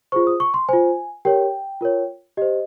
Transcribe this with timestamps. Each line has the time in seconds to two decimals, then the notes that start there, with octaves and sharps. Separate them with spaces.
0.12 F4 G#4 C5 C#6
0.27 D#6
0.40 C#6
0.54 C6
0.69 F4 C5 G#5
1.25 G4 A#4 C#5 G5
1.81 F4 A#4 C#5
2.37 G4 C5 D#5